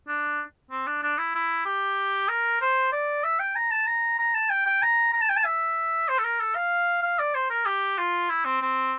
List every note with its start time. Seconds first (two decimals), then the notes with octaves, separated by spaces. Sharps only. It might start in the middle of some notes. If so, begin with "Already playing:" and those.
0.08 D4
0.71 C4
0.87 D4
1.03 D4
1.18 E4
1.35 E4
1.66 G4
2.29 A#4
2.61 C5
2.92 D5
3.24 E5
3.39 G5
3.56 A#5
3.71 A5
3.86 A#5
4.19 A#5
4.34 A5
4.50 G5
4.66 G5
4.82 A#5
5.13 A#5
5.21 A5
5.29 G5
5.36 A5
5.45 E5
6.08 C5
6.18 A4
6.24 A#4
6.40 A4
6.55 F5
7.03 F5
7.19 D5
7.34 C5
7.50 A#4
7.66 G4
7.98 F4
8.29 E4
8.45 C4
8.61 C4